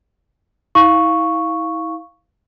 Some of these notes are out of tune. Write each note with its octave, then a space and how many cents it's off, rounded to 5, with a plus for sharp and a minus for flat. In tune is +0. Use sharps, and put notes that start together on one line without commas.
E4 -35 F5 +0 C#6 +0